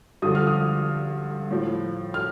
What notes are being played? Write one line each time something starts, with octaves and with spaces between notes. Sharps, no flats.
G2 D3 F3 D#6
F6
D#6
A2 F3
F6